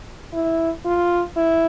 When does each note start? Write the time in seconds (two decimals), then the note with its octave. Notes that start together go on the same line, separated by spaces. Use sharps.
0.34 E4
0.85 F4
1.36 E4